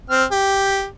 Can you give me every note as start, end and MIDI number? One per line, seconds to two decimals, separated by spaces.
0.10 0.24 60
0.10 0.24 89
0.31 0.86 67